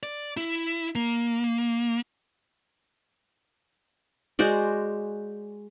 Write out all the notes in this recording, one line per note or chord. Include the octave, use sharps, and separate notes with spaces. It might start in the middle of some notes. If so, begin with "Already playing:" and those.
D5
E4
A#3
G#3 F#4 C5 D5